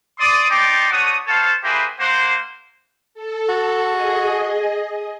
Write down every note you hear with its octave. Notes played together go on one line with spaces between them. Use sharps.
D5 C6 D#6
D#4 D5 G5 A5 C6 D6
A3 D4 F#4 C#5 D#6
A4 C5 C#5 F5 A5
A#3 E4 G4 G#4 B4 C5
A#3 C5 F#5
A4
F#4
G#4 D#5